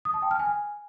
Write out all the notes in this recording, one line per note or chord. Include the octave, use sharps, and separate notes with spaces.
D#6
A5
G5
F6
G#5